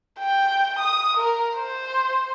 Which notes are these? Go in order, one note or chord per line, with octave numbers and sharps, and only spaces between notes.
G5
D#6
A#4
C5